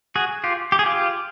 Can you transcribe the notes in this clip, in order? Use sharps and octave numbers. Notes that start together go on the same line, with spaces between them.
F#4 G#4
F4 G4
G4
G#4
F4 G4